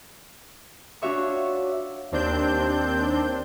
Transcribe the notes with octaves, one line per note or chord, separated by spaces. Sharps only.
D4 F4 F#4 C#5 E5 C#6
D#2 C4 D4 G6